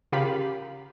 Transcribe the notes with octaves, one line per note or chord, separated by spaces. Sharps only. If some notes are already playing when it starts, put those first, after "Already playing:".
C#3 F4 G4 A#4 F5 B5